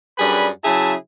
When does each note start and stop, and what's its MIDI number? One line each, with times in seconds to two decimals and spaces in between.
0.19 0.48 42
0.19 0.48 55
0.19 0.48 62
0.19 0.48 68
0.19 0.48 71
0.19 0.48 83
0.65 0.93 49
0.65 0.93 54
0.65 0.93 64
0.65 0.93 68
0.65 0.93 76
0.65 0.93 81